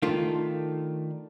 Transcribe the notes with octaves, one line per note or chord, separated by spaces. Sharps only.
D#3 A3 D4 F4